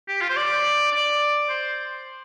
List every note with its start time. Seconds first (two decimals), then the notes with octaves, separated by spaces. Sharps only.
0.08 G4
0.22 F4
0.30 C5
0.37 D5
0.92 D5
1.49 C5